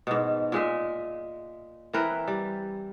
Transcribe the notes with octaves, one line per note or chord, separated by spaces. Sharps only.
G#2 B2
A#2 G#3 E5
E3 C4 A#4 B4
G3